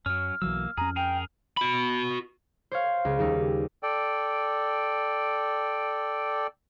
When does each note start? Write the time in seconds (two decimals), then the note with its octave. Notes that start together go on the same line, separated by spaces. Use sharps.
0.06 F#2 F#3 C#4 F6
0.42 B1 E3 F#3 A#3 E6
0.77 F2 C#4 G#4 A#5
0.96 G#4 A#4 G5
1.57 F#4 B5
2.71 C5 C#5 F5
3.05 C#2
3.19 D#2 G3 D#4
3.83 A4 D5 G5